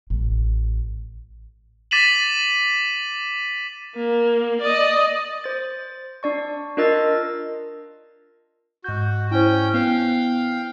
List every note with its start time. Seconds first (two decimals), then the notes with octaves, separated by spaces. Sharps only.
0.10 A1
1.91 D6 A6 B6 D#7 E7 F#7
3.96 A#3
4.61 D5 D#5
5.44 C5 A6
6.23 D4 D5 C#6
6.77 D4 F4 A#4 D#5 E6 A6
8.84 G#2 F#4 G6
9.31 C#4 E4 C5 G5
9.74 B3 F5 G5